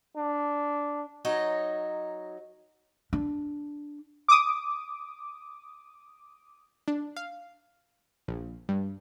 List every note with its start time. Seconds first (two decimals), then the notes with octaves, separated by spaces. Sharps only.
0.16 D4
1.25 F#3 D#4 C#5 D#5
3.13 D4
4.28 D6 D#6
6.88 D4
7.16 F5
8.28 A#1
8.69 G2